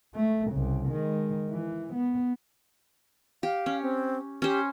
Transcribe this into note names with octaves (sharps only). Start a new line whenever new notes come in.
A3
C2 C#3
D#3 G#3
E3
B3
G4 F5
C#4
C4
C#4 G4 C5